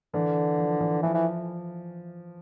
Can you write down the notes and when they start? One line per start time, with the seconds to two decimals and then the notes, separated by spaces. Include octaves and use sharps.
0.14 D3 E3
0.58 F3
0.81 E3
1.03 E3 F3
1.14 E3